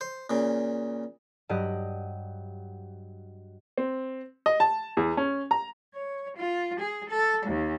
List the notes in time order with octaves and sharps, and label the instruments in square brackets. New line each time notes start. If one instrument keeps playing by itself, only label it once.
[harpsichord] C5
A#2 C#3
[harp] G2 F#3 G4 D#5 F#6
[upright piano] C4
D#5
A5
E2
C#4
A#5
[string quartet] C#5
F4
G#4
A4
D#2